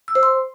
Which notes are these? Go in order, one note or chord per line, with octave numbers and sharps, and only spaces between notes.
E6
C5
C6